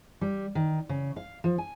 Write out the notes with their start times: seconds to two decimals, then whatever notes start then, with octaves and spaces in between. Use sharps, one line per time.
0.21 G3
0.55 D#3
0.89 C#3
1.16 F5
1.44 F3
1.58 G#5